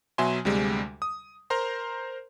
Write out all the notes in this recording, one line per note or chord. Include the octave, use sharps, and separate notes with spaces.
B2 F#3 E5 G#5 C6
D2 C3 G3 G#3
D#6
A#4 C5 A#5 C6